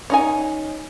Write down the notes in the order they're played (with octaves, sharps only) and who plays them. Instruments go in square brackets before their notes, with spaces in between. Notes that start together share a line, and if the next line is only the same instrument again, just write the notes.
[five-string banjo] C#4 D#4 G#5